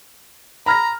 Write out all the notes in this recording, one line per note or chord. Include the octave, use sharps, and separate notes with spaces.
A#5 B5 F6 A#6